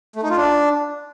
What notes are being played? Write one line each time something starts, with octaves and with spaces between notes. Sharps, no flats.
A3
D#4
F4
D4